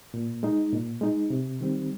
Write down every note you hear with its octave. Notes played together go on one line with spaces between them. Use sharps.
A#2
G#3 D#4
A#2
G#3 D#4
C3
D#3 G3 C4